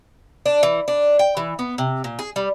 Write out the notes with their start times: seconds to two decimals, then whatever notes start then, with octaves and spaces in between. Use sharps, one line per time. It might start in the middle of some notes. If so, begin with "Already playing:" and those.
0.46 D4
0.63 E3
0.88 D4
1.19 G5
1.37 E3
1.59 B3
1.78 C3
2.04 A#2
2.19 G#4
2.36 G3